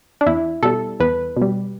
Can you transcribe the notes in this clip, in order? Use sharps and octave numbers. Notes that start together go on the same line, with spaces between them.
D4
E2 E4
B2 G3 A4
E2 B4
B2
G3